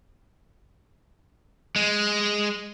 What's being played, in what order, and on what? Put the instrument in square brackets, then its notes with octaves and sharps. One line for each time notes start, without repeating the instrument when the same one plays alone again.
[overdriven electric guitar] G#3